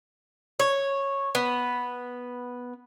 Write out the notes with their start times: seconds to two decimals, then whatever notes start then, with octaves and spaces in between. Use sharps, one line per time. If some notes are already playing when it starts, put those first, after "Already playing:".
0.60 C#5
1.35 B3